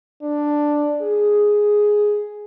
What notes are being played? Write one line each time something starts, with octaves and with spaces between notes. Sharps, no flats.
D4
G#4